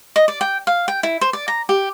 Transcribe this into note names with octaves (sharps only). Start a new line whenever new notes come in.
D#5
D5
G5
F5
G5
E4
C5
D5
A#5
G4